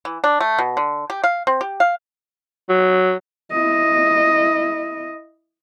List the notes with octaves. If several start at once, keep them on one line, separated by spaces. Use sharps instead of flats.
E3
D4
A3
B2
D3
G4
F5
C4
G4
F5
F#3
E4 D#5